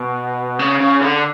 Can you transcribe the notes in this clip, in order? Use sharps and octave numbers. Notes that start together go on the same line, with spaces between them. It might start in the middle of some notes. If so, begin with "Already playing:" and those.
Already playing: B2
C#3
C#3
D3